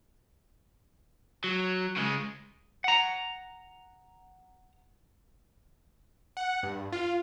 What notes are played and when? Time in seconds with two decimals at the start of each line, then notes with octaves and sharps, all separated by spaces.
1.44 F#3
1.96 C#3 G#3
2.84 F#5 A#5
6.37 F#5
6.63 G2
6.92 F4